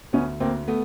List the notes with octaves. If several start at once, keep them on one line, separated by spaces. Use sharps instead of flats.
D2 B3 C#4
D2 A#3 C4
A3 B3